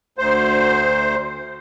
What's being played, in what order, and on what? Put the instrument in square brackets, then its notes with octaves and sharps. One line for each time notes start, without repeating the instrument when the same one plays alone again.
[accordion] D2 C5